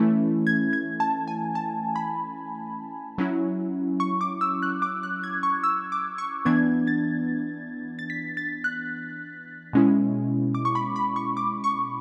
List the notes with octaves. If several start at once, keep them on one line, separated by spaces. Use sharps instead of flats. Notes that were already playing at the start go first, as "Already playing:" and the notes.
Already playing: E3 A3 C#4 E4
G#6
G#6
A5
G#5
A5
B5
F#3 C#4 E4
C#6
D6
E6
F#6
D6
F#6
G#6
C#6
E6
D6
C#6
E3 B3 D4 G#6
A6
A6
B6
A6
F#6
B2 G#3 C#4 E4
D6
C#6
B5
B5
C#6
D6
C#6